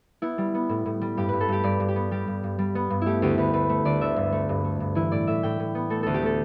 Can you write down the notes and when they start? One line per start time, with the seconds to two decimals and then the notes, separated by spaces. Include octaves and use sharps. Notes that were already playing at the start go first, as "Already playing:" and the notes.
0.22 B3 E4
0.38 G3
0.55 B3
0.69 A2
0.86 A2
1.01 G3
1.17 G2 G4
1.29 G2 B4
1.40 A4
1.48 G2 G4
1.64 G2 D5
1.80 G2
1.88 G4
1.96 B3
2.11 G3 G4
2.28 G2
2.44 G2
2.59 G3
2.75 B3
2.90 G2
3.02 A3 E4 G4
3.22 D2 G4
3.38 D2 B4
3.53 D2 B4
3.69 A3
3.85 D2 D5
4.01 D3 E5
4.16 G2
4.32 A3
4.49 G2
4.64 A3
4.80 G2
4.95 E3 E4
5.12 A2 D5
5.27 A2 E5
5.43 A2 G5
5.60 A2
5.75 B3
5.90 A3 A4
6.03 D2 A4
6.14 G4
6.22 A3 A4